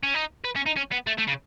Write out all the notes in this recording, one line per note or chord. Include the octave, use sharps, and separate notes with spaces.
C#4
D#4
B4
C#4
D#4
C#4
B3
A3
A3
C#3